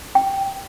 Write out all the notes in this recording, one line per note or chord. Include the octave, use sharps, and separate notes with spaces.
G5